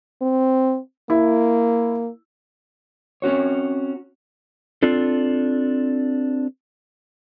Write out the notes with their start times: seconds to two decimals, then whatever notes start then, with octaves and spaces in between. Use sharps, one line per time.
0.22 C4
1.10 A#3 E4
3.22 C4 C#4 F#4 C#5
4.83 C4 D4 F4 A4